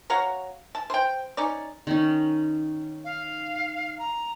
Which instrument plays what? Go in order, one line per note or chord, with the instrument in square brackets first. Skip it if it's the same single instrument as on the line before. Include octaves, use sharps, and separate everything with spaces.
[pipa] F#4 C#5 F5 A#5
A5
C5 G5
C#4 D#4 D5
[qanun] D#3 C#4
[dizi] F5
A#5